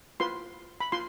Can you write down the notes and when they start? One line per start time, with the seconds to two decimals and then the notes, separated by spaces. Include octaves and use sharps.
0.20 F4 B4 C6
0.80 B5
0.92 F4 C6